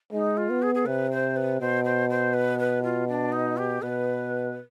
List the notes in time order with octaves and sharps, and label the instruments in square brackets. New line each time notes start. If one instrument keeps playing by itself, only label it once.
[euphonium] G#3 [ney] D#4
[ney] F4
[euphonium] B3
[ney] G#4
G#4
[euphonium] C3 [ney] B4
[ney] C5
B4
[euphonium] B2 [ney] C5
[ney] C5
C5
B4
B4
F4
D4
D#4
G4
[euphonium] B2 [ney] B4